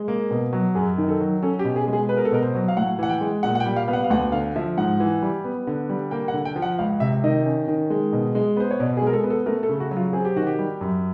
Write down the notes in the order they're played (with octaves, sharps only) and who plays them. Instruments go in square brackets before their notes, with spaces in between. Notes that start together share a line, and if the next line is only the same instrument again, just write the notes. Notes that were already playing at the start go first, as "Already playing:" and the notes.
Already playing: [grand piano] G#3
A#3
B2
F#3
F#2 G#4
D#3
A4
F#3
C#4 A4
G4
B2
G#4
G#3
G#4
B3 B4
A#4
A4
B2 A#4
C5
F#3
F5
A2 F#5
E3 F#5
G5
G#3
A#2 F#5
F#5
G5
G3
F5
B3 F5
F#5
F5
D2 F#5
D3 F5
F3 E5
G#2 F#5
E3
G3
B3
D3
G3
A#3 G5
F#5
D3
G5
F3
F#5
C#2 F5
C3 E5
D#3 D#5
C#4
D#3
G#3
B2
G#3
B3 C5
C#5
B2 D5
G#4
G#3
A#4
A4
B3
A4
A3 A#4
A4
C#3
F#4
F#3
F4
C4 G#4
G4
D#3 F#4
G4
G3
F#2